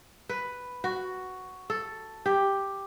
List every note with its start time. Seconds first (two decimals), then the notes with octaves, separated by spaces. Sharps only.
0.29 B4
0.84 F#4
1.70 A4
2.26 G4